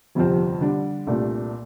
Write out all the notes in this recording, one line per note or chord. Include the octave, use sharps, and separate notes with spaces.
G1 F2 C3 F3 C4
D3 G3 D4
C2 A#2 A3 D4